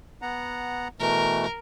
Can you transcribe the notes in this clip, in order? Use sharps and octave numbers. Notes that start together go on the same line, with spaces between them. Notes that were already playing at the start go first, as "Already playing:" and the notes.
B3 F#5 A#5
B2 E3 A3 A#4